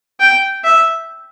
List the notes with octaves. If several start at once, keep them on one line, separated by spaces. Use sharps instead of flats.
G5
E5